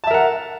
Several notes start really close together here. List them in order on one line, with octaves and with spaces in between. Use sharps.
A5 E5 A#4 F#5